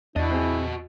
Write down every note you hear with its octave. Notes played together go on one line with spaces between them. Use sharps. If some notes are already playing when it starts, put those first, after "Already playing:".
E2 D4 E4 F#4 D#5 A6
C4 G#4